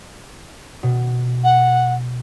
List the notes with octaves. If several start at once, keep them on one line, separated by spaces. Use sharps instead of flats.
B2
F#5